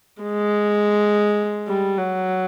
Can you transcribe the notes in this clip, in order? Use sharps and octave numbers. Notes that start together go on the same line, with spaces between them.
G#3
G3
F#3